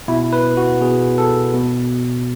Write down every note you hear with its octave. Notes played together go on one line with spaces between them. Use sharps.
B2 E4
B4
F#4
B2 G#4
A4
B2